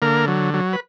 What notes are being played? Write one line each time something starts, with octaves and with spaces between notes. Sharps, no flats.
D3 A#3 A#4
F#3
F#3
B4